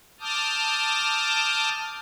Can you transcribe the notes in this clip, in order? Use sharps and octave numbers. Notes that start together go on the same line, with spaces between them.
A5 D6 D#6 F6 G6